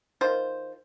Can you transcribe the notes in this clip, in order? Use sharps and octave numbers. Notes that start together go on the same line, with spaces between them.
D#3 F4 C5